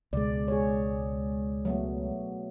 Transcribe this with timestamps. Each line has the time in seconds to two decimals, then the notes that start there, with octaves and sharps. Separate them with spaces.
0.13 C#2 B2 G#3 D5
0.48 G#4 C#5
1.65 F#3 A3 B3